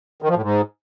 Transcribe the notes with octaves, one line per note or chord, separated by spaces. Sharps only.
D#3
F3
A2
G#2